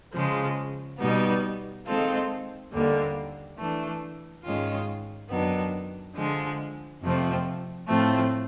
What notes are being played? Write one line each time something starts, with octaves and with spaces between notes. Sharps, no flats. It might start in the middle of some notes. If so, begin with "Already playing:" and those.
C#3 F3 G#3
B2 G3 B3 D#4
D#3 G#3 C4 F4 A4
D#2 D3 G3 A#3
E3 A3 D4
G#2 D#3 G#3 C#4 F4
F#2 D#3 F#3 B3 D4
D3 F3 G#3
F2 C3 F3 A3 C4
A2 F3 A3 C4